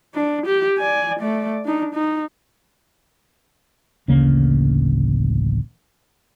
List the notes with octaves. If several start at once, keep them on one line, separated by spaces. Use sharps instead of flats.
D4
G4
D5 G#5
A3 D5
D4 D#4
D#4
D1 A1 C#3 A#3